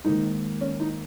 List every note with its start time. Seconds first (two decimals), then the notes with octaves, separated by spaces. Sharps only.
0.05 G#2 D#3 A#3 D#4
0.61 C#4
0.80 D#4